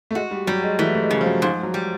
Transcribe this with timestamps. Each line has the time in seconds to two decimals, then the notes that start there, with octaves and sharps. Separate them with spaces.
0.11 A3
0.15 G#3 F#4
0.31 G3
0.47 F#3 G3
0.63 G#3
0.79 E3 A3
0.95 A3
1.03 G#3
1.10 C#3 G3
1.21 F3
1.26 F#3
1.42 G#2 F3
1.63 F#3
1.74 G3